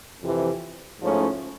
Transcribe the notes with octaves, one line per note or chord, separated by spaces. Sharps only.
F2 C3 E3
G#2 F3 A3 C#4 E4